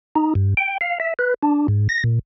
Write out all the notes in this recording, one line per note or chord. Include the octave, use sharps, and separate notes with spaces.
D#4
G2
G5
F5
E5
B4
D4
G#2
A#6
A#2